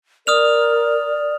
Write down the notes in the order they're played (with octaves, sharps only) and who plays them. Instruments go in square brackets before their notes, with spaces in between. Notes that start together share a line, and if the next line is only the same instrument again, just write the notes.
[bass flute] A#4 [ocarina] D5 [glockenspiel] D#6 F6 F7